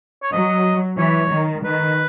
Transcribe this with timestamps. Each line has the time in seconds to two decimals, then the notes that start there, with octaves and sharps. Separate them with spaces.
0.23 C#5
0.32 F#3 D#5
0.98 E3 C#5
1.31 D#3
1.64 D#3 B4